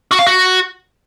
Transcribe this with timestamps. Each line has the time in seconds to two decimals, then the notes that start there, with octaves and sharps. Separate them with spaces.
0.11 F#4
0.19 F5
0.26 F#4